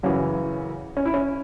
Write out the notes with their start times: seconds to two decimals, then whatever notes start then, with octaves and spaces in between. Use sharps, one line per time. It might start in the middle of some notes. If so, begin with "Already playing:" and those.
0.03 F#2 C#3 E3 C#4 F#4
0.97 C#4
1.06 E4
1.14 C#4